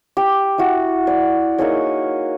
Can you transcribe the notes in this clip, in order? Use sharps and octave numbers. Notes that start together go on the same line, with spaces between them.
G4
E4 F#4
D5
A#3 D#4 G#4 C#5